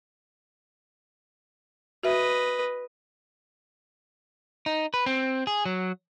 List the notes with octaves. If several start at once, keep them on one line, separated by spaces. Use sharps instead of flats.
F#4 B4 D#5 E5
D#4
B4
C4
G#4
F#3